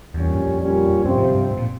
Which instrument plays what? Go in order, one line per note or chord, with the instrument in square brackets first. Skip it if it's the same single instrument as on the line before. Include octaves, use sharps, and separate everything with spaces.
[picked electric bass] E2 [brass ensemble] A#2 G3 C#4
[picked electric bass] G2
F2
[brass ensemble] A#2 G3 C#4
[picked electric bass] G2 [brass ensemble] C3 F3 C4
[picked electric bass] G#2
G2
G#2
A#2